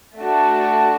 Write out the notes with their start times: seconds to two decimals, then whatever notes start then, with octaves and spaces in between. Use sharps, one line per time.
0.17 A3 D4 F#4